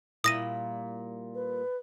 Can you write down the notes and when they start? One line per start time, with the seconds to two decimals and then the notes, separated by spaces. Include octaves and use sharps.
0.24 A#2 G3 E4 D#6 A#6 D#7
1.35 B4